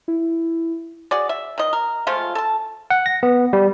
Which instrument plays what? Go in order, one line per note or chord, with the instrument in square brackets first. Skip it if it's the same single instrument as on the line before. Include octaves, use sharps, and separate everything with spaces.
[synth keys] E4
[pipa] F#4 G#4 D5
E5
D#3 D#5
A#4
F3 G#3 A3 F4
A4 A5
[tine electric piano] F#5
A#6
B3
G3